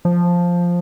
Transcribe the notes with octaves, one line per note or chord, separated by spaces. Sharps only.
F3